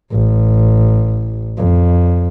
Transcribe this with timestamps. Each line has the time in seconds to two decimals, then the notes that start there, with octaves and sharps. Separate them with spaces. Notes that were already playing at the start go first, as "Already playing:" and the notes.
0.12 A1
1.58 F2